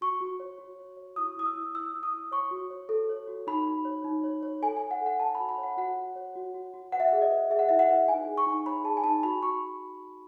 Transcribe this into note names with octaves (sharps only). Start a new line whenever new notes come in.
F#4 C#6
F#4
C#5
F#4
C#5
C#5
E4 D#6
E4 D#6
E6
E4
E4 E6
E4
D#6
E4
C#5 C#6
F#4
C#5
A4
C#5
F#4
D#4 B5
D#4
C#5
D#4
C#5
C#5
A4 G#5
G#5
A4
F#5
A4
F#5
A4 A5
F#4 B5
B5
C#5
F#5
F#4 F#5
F#4
C#5
F#4
F#4
F#4
B4 F#5
E5
G#4 F#5
D#5
B4
G#4 E5
F#5
E4 E5
F#5
B4
D#4 G#5
G#4
C#6
D#4
C#5 B5
G#4 A5
G#5
D#4 A5
F#4 B5
F#4 C#6